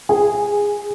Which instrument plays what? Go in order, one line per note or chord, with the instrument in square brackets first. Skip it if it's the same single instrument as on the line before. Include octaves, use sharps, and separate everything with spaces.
[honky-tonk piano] G#4